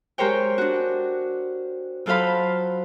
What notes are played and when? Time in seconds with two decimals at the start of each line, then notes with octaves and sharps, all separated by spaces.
0.18 G#3 G4 A#4 C5 C#5 G5
0.58 D4 F#4
2.06 F#3 F4 A4 C5 F5 B5